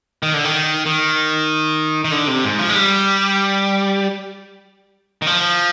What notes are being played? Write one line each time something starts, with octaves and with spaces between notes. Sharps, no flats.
D#3
D3
D#3
D#3
D#3
D3
C3
G#2
F3
G#3
G3
D#3
F3